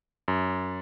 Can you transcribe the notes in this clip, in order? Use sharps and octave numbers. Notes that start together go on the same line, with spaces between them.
F#2